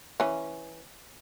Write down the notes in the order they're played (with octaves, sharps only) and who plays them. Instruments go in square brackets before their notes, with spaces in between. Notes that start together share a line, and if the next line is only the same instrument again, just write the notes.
[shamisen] E3 C#4